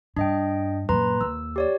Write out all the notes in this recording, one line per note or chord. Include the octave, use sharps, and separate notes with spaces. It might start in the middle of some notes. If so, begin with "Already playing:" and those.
G2 D4 D#5 G5
F#2 A#2 B4 A#5 C6
D#2 E6
G4 C#5 D5